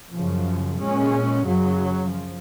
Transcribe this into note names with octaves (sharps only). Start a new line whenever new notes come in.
F#2 C#3 F3
A#2 G#3 C#4
F#2 C#3 F#3
F3